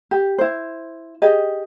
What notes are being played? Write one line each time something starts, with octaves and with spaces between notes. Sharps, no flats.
G4
E4 C5
G4 G#4 D#5